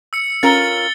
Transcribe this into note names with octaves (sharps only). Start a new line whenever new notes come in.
E6 C#7
C#4 F4 A#4 A6 C#7 G7